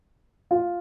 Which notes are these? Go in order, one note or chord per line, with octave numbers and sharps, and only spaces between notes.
F4